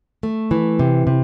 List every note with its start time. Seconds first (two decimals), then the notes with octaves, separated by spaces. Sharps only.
0.23 A3
0.51 E3
0.79 C3
1.07 C3